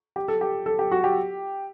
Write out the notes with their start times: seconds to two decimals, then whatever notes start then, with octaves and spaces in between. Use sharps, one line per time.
0.16 G4
0.28 A4
0.41 G4
0.66 A4
0.79 G4
0.91 F#4
1.04 G4